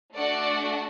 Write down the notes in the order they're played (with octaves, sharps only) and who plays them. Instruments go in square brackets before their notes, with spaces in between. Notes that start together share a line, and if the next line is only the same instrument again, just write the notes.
[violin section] A3 D4 F#4 D5 F#5